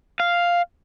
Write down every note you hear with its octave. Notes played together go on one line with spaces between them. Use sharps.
F5